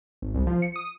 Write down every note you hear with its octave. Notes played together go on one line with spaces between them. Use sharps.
G#1
C2
F3
C#7
D#6